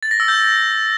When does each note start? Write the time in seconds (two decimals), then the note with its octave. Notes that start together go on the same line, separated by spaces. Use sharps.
0.03 A6
0.11 A#6
0.20 E6
0.28 G6